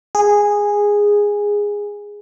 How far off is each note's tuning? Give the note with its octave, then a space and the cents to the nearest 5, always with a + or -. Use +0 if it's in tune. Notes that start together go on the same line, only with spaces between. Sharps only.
G#4 -10